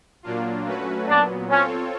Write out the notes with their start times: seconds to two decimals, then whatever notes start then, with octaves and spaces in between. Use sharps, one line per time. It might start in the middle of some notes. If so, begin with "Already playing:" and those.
0.23 A#2 F#3 A#3 D4 F4
0.65 F#3 A3 C#4 F#4 B4
1.07 A#2 F#3 B3 D4
1.49 C4 C#4 F4 A4 C#5